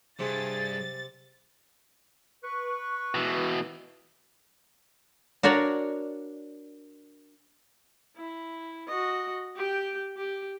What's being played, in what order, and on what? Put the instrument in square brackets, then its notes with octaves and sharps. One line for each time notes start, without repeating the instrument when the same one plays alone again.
[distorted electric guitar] G2 [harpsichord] C3 [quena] G#4 [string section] A6
[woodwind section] B4 C#6
[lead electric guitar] B2 E3
[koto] D4 F#4 A#4 C#5 D5
[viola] E4
F#4 D#5
G4 G5
G4